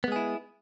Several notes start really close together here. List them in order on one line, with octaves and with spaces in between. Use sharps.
B3 G#3 G#4 E4